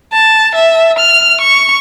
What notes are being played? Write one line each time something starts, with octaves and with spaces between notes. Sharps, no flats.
A5
E5
F6
C#6